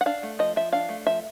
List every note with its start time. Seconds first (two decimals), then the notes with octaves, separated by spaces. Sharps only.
0.01 F#5
0.06 D4 F5
0.23 A3
0.39 F3 D#5
0.56 F3 E5
0.72 D4 F5
0.89 A3
1.06 F3 E5